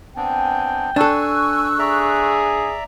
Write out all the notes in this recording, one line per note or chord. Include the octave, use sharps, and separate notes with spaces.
B3 C4 D4 G5 G#5
D4 A4 G#5 C#6 E6 F#6
G#4 D5 E5 A#5